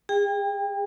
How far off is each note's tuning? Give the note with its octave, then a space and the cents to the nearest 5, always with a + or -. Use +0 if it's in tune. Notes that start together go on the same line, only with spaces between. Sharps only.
G#4 -30 G5 +25